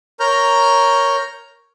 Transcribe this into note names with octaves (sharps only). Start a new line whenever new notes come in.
A#4 C#5 A#5 F6 G6